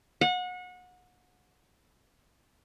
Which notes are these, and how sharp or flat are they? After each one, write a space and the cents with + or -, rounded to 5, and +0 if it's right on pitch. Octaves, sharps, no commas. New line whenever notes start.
F#5 -30